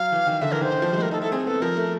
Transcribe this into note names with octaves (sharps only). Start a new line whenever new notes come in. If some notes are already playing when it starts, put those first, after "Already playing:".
Already playing: F#3 F5
E3
D#3
D3 E5
E3 A#4
D#3 C5
D#3
F3
G3
G#3
A3 A#4
D#4 A4
E4 A4
C4 G#4
B3 A4
F3 A#4
A3